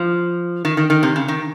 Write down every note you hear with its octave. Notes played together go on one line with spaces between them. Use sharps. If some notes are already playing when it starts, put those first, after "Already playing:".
Already playing: F3
D#3
D#3
D#3
C3
C#3
D#3